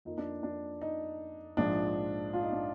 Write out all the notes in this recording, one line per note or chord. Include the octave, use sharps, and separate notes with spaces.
F2 F3 A#3 D#4
D4
D4
D#4
A#1 G#2 F3 D4
F4
D#4
D4